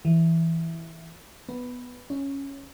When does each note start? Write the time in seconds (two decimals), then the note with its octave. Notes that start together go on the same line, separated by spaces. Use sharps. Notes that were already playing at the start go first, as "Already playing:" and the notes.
0.05 E3
1.49 B3
2.10 C#4